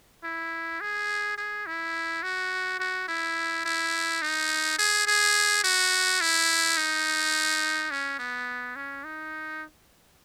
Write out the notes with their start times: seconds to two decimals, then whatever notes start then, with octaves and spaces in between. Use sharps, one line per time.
0.24 E4
0.81 G#4
1.38 G#4
1.67 E4
2.23 F#4
2.79 F#4
3.08 E4
3.65 E4
4.22 D#4
4.79 G#4
5.07 G#4
5.64 F#4
6.21 E4
6.77 D#4
7.91 C#4
8.19 B3
8.76 C#4
9.04 D#4